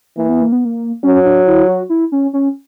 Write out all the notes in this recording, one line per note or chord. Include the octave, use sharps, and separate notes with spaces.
E3 A#3
B3
A#3
B3
A#3
F#3 C#4
D4
E4
F#4
E4
C#4
C#4